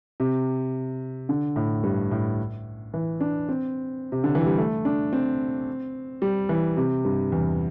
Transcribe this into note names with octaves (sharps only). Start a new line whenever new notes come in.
C3
D3
A2
G2
A2
E3
D4
C4
C3
D3
E3
G3
A3
D4
C4
G3
E3
C3
G2
E2